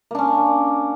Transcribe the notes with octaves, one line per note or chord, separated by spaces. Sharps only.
A#3 C#4 D4